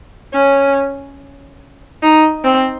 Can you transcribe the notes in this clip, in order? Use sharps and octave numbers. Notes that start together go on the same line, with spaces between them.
C#4
D#4
C4